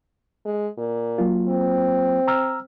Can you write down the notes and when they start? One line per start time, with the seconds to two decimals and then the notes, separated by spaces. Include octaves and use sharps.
0.45 G#3
0.78 A#2
1.18 F#3 A#3 F4
1.48 C4
2.28 A#5 E6 F6